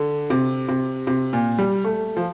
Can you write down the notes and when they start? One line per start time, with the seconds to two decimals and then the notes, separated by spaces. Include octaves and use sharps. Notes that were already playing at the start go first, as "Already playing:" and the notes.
Already playing: D3
0.30 C3
0.68 C3
1.07 C3
1.33 A#2
1.59 G3
1.84 A3
2.17 F3